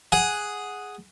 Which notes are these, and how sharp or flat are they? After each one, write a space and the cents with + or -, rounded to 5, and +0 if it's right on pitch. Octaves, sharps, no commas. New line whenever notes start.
G#4 +0 F#5 +0